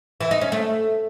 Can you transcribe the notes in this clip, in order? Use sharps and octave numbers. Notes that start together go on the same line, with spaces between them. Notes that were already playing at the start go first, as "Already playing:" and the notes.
E3
D#4
C#4
A3